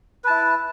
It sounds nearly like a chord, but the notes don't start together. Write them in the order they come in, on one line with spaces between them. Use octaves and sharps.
B4 A5 E4